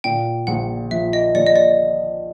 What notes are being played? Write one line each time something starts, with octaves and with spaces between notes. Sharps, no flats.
A#2 G5
A#1 F#5
F3 E5
D#5
A#1 D5
D#5
D5